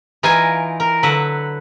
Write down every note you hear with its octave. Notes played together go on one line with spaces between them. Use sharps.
E3 D#4 F4 A#4 G#5 A#5
A#4
D3 F#3 B4 E5 F#5